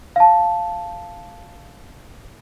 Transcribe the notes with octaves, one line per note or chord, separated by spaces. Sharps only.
F5 A5